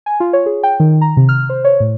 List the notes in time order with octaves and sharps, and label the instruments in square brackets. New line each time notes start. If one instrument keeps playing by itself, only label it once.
[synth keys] G#5
F4
C#5
G#4
G5
D#3
A#5
C3
F6
C5
C#5
A2